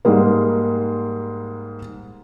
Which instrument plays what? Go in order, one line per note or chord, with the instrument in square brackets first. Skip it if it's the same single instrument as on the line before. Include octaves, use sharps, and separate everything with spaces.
[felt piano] G#2 G3 G#3 A#3